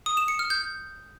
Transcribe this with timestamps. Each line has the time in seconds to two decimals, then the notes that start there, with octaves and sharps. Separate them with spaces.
0.06 D#6
0.17 E7
0.28 C#7
0.39 F6
0.50 G6